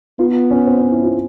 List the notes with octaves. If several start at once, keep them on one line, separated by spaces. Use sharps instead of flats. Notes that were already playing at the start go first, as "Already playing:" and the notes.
B3 F4
C#4
C4
C#4
E4
F4